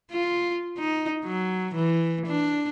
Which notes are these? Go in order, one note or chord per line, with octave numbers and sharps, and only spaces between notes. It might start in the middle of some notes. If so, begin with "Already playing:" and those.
F4
D#4
F#3
E3
D4